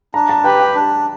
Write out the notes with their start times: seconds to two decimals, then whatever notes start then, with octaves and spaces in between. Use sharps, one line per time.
0.14 D4 A#5
0.29 A5
0.44 G4 B4 G5
0.60 G5
0.75 D4